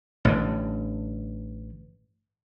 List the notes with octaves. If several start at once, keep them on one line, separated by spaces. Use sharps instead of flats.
A1 G2 D3